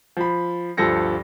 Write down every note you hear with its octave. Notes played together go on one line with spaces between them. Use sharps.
F3 B5
D2 G2 F3 A4 A#6 C#7